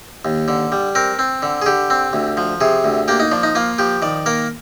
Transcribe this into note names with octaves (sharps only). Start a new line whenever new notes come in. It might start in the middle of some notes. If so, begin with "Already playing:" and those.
D#2
D3
G3
C4 A#4
C4
D3
G#4
D3 G4
C4
D2
F3
C3 G#4
D2
A#3 G4
D#4
F3 D4
D#4
A#3 F4
F3 G4
D#3 D5
A#3 A#4